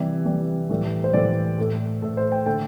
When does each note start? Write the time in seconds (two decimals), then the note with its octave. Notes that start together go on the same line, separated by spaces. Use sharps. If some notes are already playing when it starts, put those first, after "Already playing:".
Already playing: C3 E3 G3 E5
0.25 C3 E3 G3
0.69 A2 E3 G3
1.04 C5
1.13 A2 E3 G3 D5
1.58 A2 A3
2.02 A2 A3 A4
2.17 C5
2.32 G5
2.46 D3 A3 G5